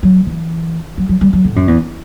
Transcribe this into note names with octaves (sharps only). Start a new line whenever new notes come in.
F#3
E3
F#3
F#3
G3
F#3
A2
F#2
E2